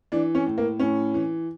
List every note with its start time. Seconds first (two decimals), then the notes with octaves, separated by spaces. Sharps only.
0.12 E3 D4
0.35 C#4
0.47 A2
0.58 A#3
0.80 A2 C#4
1.14 E3